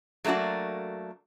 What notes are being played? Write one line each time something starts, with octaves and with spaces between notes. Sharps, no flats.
F#3 A3 A#3 D4 F#4